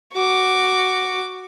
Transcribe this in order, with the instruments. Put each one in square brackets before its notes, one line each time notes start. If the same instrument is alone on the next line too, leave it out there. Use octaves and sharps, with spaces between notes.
[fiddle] F#4 D6